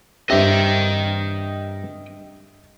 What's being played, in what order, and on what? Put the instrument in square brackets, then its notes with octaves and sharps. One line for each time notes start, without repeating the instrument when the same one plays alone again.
[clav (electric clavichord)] G2 C4 G4 [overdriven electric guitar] D#5 G5 [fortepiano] E5